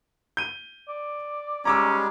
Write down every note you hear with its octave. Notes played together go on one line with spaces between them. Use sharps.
G6 D#7
D5
G3 G#3 C#4 D#4 A#5 D6 E6